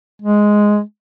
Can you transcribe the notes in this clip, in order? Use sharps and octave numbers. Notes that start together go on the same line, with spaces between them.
G#3